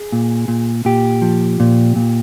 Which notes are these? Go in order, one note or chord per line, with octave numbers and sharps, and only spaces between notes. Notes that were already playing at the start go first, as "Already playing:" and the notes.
Already playing: G#4
A#2
A#2
A#2 G4
F3
A#2
A#2